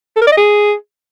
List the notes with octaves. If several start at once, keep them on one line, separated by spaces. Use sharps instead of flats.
A4
A#4
D5
D#5
G#4